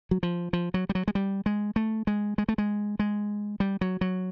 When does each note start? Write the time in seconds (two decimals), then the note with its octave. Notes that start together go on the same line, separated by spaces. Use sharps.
0.11 F#3
0.23 F3
0.53 F3
0.74 F#3
0.89 G3
0.95 F#3
1.08 G#3
1.15 G3
1.46 G#3
1.76 A3
2.07 G#3
2.38 G#3
2.48 A3
2.58 G#3
2.99 G#3
3.60 G3
3.81 F#3
4.01 F#3